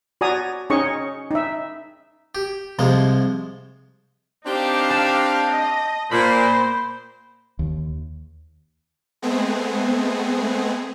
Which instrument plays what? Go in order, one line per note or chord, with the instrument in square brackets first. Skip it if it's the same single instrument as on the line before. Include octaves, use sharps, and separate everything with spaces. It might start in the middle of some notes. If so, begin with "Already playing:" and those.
[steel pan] F#4 D5 G#5 A#5 D#6
C#4 D#4 G#4 C#5 D#5 C#6
D#4 E5
[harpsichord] G4
[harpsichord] C2 F3 G#3 [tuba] C3
[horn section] C4 D4 G4 [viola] D#4 F5
[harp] A5
[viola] D#5
[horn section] A#2 [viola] A#3 C5 [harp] B5
[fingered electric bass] D#2
[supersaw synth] G#3 A3 B3 C4 G#4